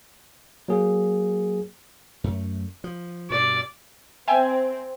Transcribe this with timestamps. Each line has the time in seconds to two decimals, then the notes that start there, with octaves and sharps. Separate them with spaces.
0.68 F#3 A#3 G#4
2.24 F#2 A3
2.84 F3
3.30 G2 B2 D5
4.28 C4 E5 G5 G#5